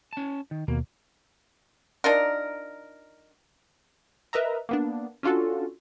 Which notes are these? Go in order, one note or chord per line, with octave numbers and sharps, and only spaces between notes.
C#4 A5
D#3
D#2 B2 A#3
D4 D#4 F4 A#4
A#4 B4 D#5 E5 A#5
A#3 B3 D4
C#4 D4 F4 F#4 A4